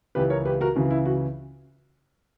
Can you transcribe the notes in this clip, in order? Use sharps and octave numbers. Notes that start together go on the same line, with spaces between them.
C#2 C#3 E3 G4 B4
A#4 C#5
G4 B4
F#4 A#4
C#2 C#3 E3 F#4
E4
F#4